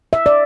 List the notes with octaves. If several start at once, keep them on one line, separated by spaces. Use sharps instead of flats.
E5
D5